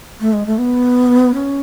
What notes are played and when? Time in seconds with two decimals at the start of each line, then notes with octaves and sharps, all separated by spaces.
0.21 A3
0.33 G#3
0.46 A3
0.58 B3
1.34 C#4